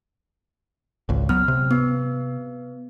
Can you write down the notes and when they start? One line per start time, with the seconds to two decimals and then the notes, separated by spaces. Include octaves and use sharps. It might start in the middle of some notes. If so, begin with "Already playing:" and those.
1.09 G#1 C#2
1.29 F#3 B3 F6
1.48 C3
1.71 B3